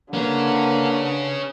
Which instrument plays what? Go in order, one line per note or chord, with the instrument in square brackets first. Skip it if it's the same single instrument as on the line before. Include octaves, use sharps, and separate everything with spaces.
[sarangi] D3 [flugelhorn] A#3 [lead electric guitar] C#4 G#4 [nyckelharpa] B4